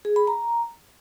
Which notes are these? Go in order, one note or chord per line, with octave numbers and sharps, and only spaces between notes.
G#4
B5
A#5